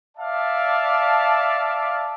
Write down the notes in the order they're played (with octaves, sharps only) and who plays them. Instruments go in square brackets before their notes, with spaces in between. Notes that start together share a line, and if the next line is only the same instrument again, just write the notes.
[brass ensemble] D5 E5 F5 A5